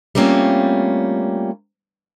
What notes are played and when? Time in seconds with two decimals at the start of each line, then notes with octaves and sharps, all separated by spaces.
0.15 G3 A3 A#3 C4 C#4 F4